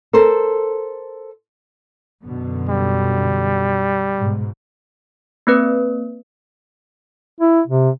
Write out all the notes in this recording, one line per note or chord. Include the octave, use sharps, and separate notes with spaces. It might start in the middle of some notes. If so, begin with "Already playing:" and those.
A4 A#4 C5
F#2 B2 D3
G3
G#2 B2
A#3 C4 B4
E4
C3